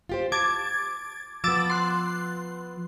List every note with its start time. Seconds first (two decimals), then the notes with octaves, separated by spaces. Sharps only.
0.09 F4 G4 C5
0.32 A5 D6 G#6 A6
1.44 F3 B3 D6 E6 A6
1.70 C6 F#6